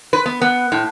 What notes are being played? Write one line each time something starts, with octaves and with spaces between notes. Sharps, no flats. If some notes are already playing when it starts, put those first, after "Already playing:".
B4
B3
B3
A2